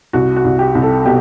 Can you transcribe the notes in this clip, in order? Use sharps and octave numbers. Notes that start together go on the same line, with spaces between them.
C2 F#4
F#4
C2
G4
C2
A4
B2 G4